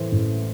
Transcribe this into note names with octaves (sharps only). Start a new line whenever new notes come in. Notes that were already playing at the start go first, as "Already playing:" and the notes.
Already playing: A2 E3 C5
A1